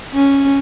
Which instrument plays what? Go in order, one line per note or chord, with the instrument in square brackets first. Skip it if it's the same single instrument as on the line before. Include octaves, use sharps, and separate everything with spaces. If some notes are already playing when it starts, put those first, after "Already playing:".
[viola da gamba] C#4